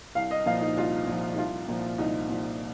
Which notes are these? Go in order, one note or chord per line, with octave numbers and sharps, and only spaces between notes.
C2 F5
D#5
A#2 F3 F5
D#4
C2 F4
A#2 F3
D#4
C2 F4
A#2 F3
C2 D#4
A#2 F3